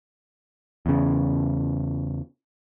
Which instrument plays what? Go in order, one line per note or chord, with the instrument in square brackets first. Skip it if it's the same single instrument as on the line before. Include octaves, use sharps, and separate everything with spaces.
[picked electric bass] E2 C#3